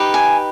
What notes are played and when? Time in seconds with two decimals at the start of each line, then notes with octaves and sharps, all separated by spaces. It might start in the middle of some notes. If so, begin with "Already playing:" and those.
Already playing: D#4 G4 B4
0.14 G#5